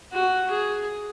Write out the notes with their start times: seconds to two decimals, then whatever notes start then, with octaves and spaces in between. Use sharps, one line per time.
0.13 F#4
0.51 G#4